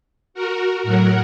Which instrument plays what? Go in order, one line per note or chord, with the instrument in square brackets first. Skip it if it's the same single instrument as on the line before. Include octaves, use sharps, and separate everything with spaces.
[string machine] F#4 A#4
A2 F#3 F#4 A#4